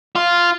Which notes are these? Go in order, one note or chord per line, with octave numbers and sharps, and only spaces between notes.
F4